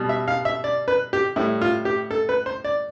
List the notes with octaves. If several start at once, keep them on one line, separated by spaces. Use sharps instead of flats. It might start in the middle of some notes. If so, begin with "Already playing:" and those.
Already playing: B2 G3
E5
F5
E5
D5
B4
G4
A2 G3 E4
F4
G4
A4
B4
C5
D5